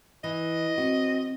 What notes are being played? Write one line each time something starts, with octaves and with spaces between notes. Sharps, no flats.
E3 D#5
C4 F#4